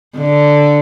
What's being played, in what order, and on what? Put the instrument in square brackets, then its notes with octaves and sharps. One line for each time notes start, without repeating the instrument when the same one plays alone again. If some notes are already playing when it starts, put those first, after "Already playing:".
[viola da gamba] D3